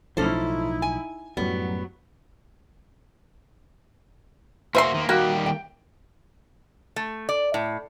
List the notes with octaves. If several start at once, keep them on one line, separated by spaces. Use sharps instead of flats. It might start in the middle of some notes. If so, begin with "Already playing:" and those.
B1 A2 F3 C#4 D#4 E4 A4 C5
G#5
F#2 A2 F#3 G3 B3
A#3 F#4 C5 E5 C6
D#3 A#3
D#3 G3 A#3 F#4 G4
G5
A3
D5
A2